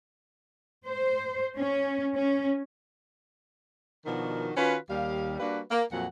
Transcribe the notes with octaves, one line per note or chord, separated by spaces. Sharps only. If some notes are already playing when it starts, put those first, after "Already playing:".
C5
C#4
C#4
B2 D#3 F3 D4 F#4 A#4
D#3 C#4 F4 F#4 B4
D#2 G3 F5
G3 A#3 D4 F#4 B4
A#3
F2 A#2 F#3 F#5